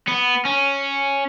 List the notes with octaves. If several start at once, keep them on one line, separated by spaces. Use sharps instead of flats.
B3
C#4